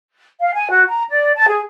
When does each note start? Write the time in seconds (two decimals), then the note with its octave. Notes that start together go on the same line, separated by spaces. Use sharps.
0.40 F5
0.54 G#5
0.70 F#4
0.88 A#5
1.10 D5
1.35 A5
1.48 G#4